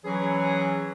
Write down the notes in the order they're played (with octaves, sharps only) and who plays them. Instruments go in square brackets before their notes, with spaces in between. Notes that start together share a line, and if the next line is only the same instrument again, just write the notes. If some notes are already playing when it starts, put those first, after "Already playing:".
[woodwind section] E3 F#3 C#4 G#4